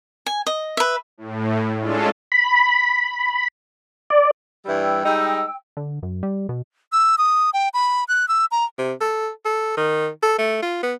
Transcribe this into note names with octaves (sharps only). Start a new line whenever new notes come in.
G#5
D#5
B4 E5
A2
G#3 C#4 D4 F4 A4
B5
D5
G2 E3 G3 G5 E6
G3 G#3 D#4
D3
F#2
G3
B2
E6
D#6
G5
B5
F#6
E6
A#5
C3
A4
A4
D#3
A4
A3
F4
B3